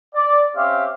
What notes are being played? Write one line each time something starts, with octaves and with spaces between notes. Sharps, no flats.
D5
C4 C#4 G4 E5 F5